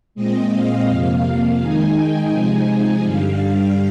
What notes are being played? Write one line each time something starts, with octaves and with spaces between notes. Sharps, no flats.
A#2 G#3 C4 D#5
F5
F2 C3 F3 A#3 F5
D#3 G#3 D#4 G#5
G5
C3 F3 G#3 D#4 G#5
G2 D3 G3 F5
F5